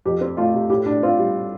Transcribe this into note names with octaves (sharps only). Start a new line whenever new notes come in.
F2 G4
C4
A3 F4
C3
A2 G4
A2 D4
C4 F4
G3